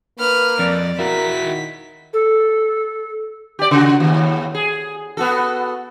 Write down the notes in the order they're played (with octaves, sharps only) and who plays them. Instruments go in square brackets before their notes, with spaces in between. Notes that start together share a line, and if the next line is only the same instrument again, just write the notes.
[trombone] A#3 [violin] B4 F6
[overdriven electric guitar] F2 [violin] D5
[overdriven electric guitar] E4 F#4 [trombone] A#4 [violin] B6
[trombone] D#3
[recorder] A4
[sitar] G4 D5
C#3 F#4
D#2 A2
G#4
B3 F#4 A4